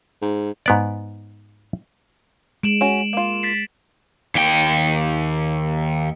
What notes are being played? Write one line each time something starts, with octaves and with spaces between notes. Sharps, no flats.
G#2
G#2 B3 D5
G#3 D7 E7 F#7
C#4 F#4 E7
A#3 F4
A6 B6 C7
D#2 G5